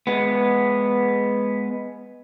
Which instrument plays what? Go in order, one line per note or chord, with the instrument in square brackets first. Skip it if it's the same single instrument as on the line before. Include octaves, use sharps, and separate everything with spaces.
[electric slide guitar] G#3 B3